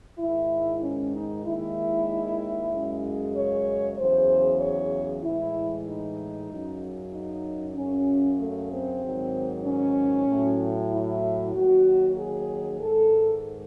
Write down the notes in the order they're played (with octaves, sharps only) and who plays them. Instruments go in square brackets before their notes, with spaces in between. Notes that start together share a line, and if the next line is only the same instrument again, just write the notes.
[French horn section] G#2 D#3 G#3 E4
C#4
D#4
D#2 D#3 G#3 E4
F#2 C#3 G#3
C#5
E2 C#3 F#3 C5
C#5
A2 E3 G#3 E4
D#4
F#2 C#3 F#3
D#4
F#2 C#3 F#3 C#4
A3
C4
G#2 D#3 F#3
C#4
A2 F#3
E4
D#2 D#3 F#3 F#4
G#4
G#2 D#3 G#3 A4